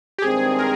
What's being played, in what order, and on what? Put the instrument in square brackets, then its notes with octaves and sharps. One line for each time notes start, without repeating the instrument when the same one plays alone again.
[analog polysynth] G4
[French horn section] G2 D#3 G#3 C4 [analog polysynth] G#4
[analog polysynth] A#4